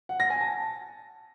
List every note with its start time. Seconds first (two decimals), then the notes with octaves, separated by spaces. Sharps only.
0.09 F#5
0.20 A#6
0.30 G#5
0.41 A5